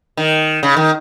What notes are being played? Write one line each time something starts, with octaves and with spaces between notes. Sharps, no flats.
D#3
C#3
D#3